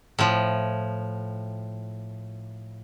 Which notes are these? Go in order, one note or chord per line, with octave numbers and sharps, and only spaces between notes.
A2 F3